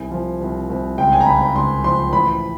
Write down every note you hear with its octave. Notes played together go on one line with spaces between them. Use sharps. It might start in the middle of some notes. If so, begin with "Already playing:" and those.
Already playing: C2 G#5
F3
C2
C2
C#2 G5
G#5
A#5
C#2 B5
B5
C#2 C6
F3 C6
A1 B5